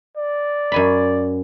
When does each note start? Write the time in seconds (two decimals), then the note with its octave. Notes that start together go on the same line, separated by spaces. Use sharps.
0.17 D5
0.72 F#2 G#5 B5